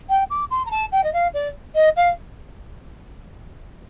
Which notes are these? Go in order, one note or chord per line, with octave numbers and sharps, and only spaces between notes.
G5
D6
C6
A#5
A5
G5
D#5
F5
D5
D#5
F5